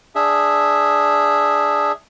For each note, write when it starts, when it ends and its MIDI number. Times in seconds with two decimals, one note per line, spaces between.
0.15 1.92 62
0.15 1.92 68
0.15 1.92 76